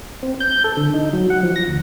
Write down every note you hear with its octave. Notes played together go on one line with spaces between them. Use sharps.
C4
G6
A4
D3
D#4
F#3
F#5
F3
A#6
D2